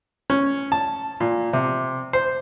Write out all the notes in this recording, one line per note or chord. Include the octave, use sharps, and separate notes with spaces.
C#4
A5
A#2
C3
C5